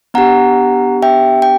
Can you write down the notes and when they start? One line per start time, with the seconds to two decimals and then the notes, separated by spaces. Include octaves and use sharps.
0.14 B3 D4 G4 F#5 A#5
1.02 E5 G5
1.42 G5